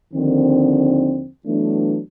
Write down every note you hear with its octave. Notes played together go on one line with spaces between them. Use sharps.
D#2 D3 D#3 F3 C4
E3 F#3 A3 B3 D4